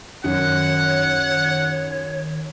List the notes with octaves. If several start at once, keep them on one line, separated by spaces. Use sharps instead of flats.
F#2 D#3 C#5 F#5